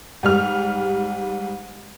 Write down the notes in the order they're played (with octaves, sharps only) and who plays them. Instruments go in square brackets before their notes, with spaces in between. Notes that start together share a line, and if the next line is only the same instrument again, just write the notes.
[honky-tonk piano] G#2 G3 F6